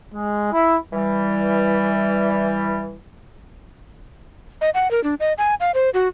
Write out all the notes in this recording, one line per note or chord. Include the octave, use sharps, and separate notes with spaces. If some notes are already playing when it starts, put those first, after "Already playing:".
G#3
E4
E3 G3
D#5
F#5
A#4
D4
D#5
G#5
F5
C5
F#4